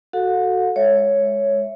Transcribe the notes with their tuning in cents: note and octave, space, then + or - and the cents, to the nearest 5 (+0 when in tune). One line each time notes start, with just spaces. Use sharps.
F#4 +0 A4 +0 F#5 -45
G#3 +0 C#5 +0 E5 +5